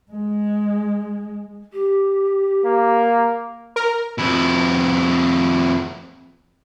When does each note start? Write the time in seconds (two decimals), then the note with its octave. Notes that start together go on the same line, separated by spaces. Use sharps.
0.12 G#3
1.73 G4
2.65 A#3
3.76 A#4
4.19 F2 E4